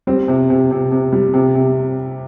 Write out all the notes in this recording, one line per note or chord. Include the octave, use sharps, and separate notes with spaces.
G3 C4
C3
C3
C3
C3
G3
C3
C3